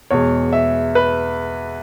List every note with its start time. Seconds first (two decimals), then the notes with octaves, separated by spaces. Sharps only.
0.11 E2 B2 G#3 C#5
0.53 E5
0.95 B4